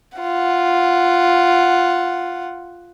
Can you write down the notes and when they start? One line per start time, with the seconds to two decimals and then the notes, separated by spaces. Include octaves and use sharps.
0.18 F4 F#5